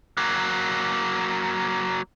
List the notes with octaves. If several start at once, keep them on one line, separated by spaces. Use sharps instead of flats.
F#3 A#3